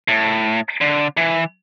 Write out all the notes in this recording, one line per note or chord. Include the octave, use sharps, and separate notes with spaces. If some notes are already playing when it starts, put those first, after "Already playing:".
A2
D3
E3